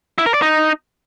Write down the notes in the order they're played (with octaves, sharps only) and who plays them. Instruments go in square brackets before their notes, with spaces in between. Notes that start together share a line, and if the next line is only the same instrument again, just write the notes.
[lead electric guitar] E4
A#4
D5
D#4